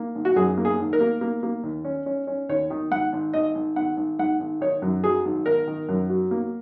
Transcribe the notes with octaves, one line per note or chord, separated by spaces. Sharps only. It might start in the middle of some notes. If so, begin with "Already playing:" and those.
Already playing: A#3
G#1
F#4
F#2 G#4
A#3
G#4
G#1
A#4
A#3
A#3
A#3
D#2
C#4
C#4
C#4
D#2 C#5
D#3
G#2 F#5
G#1
G#1 D#5
G#1
G#1 F#5
G#1
G#2 F#5
G#1
D#3 C#5
F#2
F#3 G#4
G#1
G#1 A#4
D#3
F#2
F#3
A#3